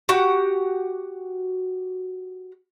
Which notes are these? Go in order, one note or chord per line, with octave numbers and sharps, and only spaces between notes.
F#4 G4 F#5